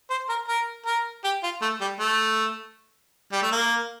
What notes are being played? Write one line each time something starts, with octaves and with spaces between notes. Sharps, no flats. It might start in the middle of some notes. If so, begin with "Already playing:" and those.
C5
A#4
A#4
A#4
G4
F4
A3
G3
A3
G3
A3
A#3